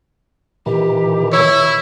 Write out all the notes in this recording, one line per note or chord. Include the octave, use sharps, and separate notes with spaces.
A#2 D#3 E3 G4
E4 C#5 E6